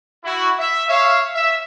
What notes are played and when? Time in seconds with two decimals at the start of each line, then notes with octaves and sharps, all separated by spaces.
0.24 E4 F#4
0.59 E5
0.88 C#5 E5 F5
1.34 E5